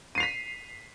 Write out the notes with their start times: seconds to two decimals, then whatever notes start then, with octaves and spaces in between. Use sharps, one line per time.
0.15 D#7
0.18 C7
0.20 F7
0.23 B6